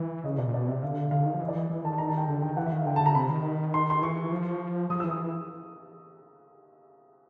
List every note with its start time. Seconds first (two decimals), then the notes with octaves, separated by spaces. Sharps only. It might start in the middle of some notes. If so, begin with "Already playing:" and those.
Already playing: E3
0.24 C#3 D#5
0.38 B2 D5
0.48 A#2
0.54 B2 D5
0.68 C3 E5
0.82 D3 F5
1.11 D3 F5
1.26 D#3
1.34 F3
1.41 E3 D#5
1.48 D5
1.56 E3 D#5
1.70 E3 D#5
1.84 D#3 A5
1.98 A#5
2.08 A5
2.18 G5
2.28 D3 G5
2.42 D#3 G5
2.57 E3 F#5
2.66 E5
2.72 D#3 F5
2.86 D3 G5
2.96 D3 A5
3.06 A#5
3.15 C3 B5
3.30 D#3
3.74 C6
3.90 C6
4.02 E3 C#6
4.32 F3
4.90 F3 D#6
5.00 E3 E6
5.10 D#6